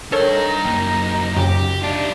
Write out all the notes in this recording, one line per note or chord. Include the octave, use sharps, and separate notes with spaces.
D4 A4 A#4 C#5 G5
D#4
F#2 A#3
F#2 C#3 G4
D4 D#4 F4